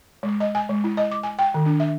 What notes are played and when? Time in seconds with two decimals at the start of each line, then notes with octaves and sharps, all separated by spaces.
0.23 G#3
0.40 D#5
0.55 G#5
0.69 G#3
0.84 E4
0.97 D#5
1.11 D6
1.23 G#5
1.39 G5
1.54 D#3
1.66 D4
1.80 E5